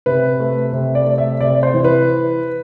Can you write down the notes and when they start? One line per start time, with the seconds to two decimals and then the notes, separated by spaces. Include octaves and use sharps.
0.06 C3 B4
0.40 A3
0.73 C3
0.95 D5
1.06 A3
1.18 E5
1.40 C3 D5
1.63 C5
1.74 E3
1.84 B4